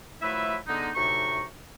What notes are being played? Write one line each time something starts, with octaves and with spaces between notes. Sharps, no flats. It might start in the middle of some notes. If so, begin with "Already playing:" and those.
F3 F#3 A3 E4 B4 E5
D3 G#3 B3 D#4
D2 A2 C3 D#4 C#6